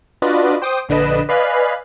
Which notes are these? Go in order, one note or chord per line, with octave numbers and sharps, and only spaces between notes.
D4 F4 F#4 B4 D5 D#5
C5 G5 D6 D#6
A#1 D3 D4 B4 D#5 E7
B4 D5 D#5 F5 G#5 B5